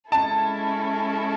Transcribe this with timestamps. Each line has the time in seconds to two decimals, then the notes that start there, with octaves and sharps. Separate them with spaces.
0.12 G#3 C#4 E4 A4 A5